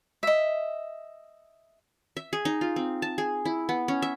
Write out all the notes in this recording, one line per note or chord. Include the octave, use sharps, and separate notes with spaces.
D#5 E5
E5
G#4
D#4
F4
C4
A5
G#4
E4
B3
C#4
E5